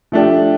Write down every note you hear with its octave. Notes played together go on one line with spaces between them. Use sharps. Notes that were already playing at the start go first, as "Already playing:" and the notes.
F3 A3 D4 G4